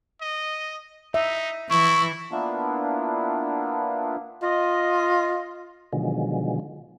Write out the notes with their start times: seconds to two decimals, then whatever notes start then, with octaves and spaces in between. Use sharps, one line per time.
0.21 D#5
1.14 D#4 E5
1.70 E3 E4 C#6
2.32 A#3 B3 D4 E4 F4
4.42 F4 D#5
5.93 B2 D3 D#3 F3 F#3 G#3